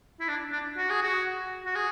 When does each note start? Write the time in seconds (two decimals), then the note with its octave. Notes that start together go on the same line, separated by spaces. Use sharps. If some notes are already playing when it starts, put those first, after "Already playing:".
0.20 E4
0.28 D4
0.52 D4
0.77 F#4
0.90 G#4
1.03 F#4
1.65 F#4
1.75 G#4